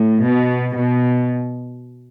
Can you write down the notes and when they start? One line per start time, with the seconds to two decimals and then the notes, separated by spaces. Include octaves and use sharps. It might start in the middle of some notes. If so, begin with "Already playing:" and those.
Already playing: A2
0.24 B2
0.77 B2